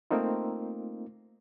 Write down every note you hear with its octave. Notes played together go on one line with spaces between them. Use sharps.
A3 A#3 C4 D#4 F4